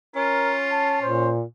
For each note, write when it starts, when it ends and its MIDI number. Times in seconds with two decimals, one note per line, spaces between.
0.16 1.29 61
0.16 1.08 65
0.16 0.55 70
0.72 1.02 81
1.02 1.43 46
1.02 1.34 72